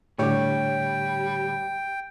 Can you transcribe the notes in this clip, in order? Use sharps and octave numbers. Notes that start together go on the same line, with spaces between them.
A2 D3 G3 G4 C#5 G5